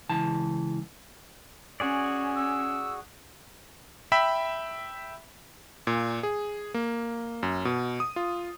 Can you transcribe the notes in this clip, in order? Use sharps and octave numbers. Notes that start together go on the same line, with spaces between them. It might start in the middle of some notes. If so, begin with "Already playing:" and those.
C#2 E3 A5
C#4 F#4 G#4 D5
E6
E5 G5 B5 E6 B6
A#2
G#4
A#3
F#2
B2
D#6
F4